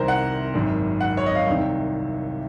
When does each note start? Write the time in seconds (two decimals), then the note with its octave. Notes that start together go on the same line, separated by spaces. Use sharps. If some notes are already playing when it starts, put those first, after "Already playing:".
Already playing: C2 C3 D#3 A#4 C5
0.08 F#5
0.54 G#1 F#2 D#3
1.01 F#5
1.17 C#5
1.26 D#5
1.35 F5
1.47 C2 C3 D#3